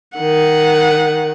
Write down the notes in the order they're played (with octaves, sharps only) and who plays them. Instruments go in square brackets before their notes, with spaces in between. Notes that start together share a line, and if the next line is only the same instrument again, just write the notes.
[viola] D#3 F#5